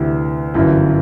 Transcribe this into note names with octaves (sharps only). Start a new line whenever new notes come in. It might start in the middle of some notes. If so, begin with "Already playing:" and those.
Already playing: D2 C3 E3
G1 F#2 E3